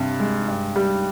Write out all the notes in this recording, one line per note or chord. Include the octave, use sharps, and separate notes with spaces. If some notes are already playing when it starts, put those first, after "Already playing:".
Already playing: G2 C3
G#3
G2
G3